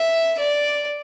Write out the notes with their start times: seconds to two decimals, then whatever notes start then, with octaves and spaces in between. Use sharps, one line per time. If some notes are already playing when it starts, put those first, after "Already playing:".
Already playing: E5
0.39 D5